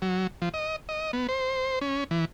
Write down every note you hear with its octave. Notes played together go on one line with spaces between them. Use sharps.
F#3
F3
D#5
D#5
B3
C5
C#4
E3